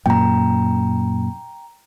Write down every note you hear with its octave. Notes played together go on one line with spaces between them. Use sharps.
F#2 A#2 G5 A#5